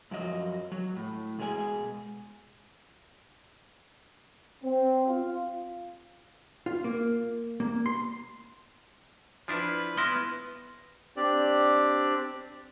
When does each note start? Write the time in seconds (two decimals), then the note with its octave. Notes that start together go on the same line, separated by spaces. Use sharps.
0.11 F#2 F3 F#3 D#5
0.72 F#3
0.96 A2
1.38 B2 G#3 G#4 C#5 G#5
4.63 C4
5.07 F4
6.66 F4
6.84 A#3
7.60 A#3
7.86 C6
9.48 F3 D4 E4 B4
9.97 B3 E4 C6 F6 A#6
11.17 C4 D4 G4 D5